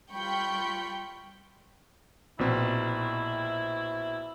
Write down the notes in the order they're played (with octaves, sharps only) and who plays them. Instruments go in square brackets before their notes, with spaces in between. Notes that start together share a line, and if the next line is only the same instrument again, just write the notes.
[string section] G3 F4 G5 B5 C#6 G6
[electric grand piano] A#1 B2 C4 [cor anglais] E4